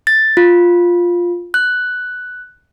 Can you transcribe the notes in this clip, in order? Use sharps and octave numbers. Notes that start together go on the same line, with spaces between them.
A6
F4
F#6